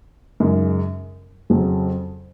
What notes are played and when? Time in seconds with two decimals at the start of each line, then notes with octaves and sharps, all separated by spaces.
0.40 F#2 C#3 G#3 D#4
1.50 F2 C#3 F#3